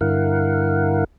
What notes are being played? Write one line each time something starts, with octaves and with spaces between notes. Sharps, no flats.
G2 D3 E4 A#4 F5 F#5